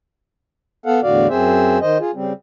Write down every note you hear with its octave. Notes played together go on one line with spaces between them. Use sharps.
B3 A4 F5 F#5
E2 A2 D3 F#4 D5 F5
F#2 C4 G#4 C5 E5
D#3 C5 D#5
F4 G#4
C#3 G3 C4